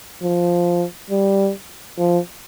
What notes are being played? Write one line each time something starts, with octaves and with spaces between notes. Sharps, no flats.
F3
G3
F3